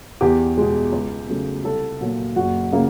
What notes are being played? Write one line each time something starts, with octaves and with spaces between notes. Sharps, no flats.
E2 G4
B2 G#3
C#2
C#3 F#3 A3
C2 A4
A#2 F#3 A#3
F#1 F#4
C#3 F#3 A#3